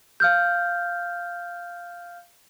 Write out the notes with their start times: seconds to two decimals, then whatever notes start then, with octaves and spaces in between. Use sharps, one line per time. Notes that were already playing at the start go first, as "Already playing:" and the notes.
0.20 F5 F6 G6